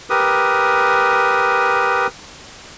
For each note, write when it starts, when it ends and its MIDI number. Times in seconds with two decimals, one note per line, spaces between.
0.10 2.07 67
0.10 2.07 70
0.10 2.07 71
0.10 2.07 87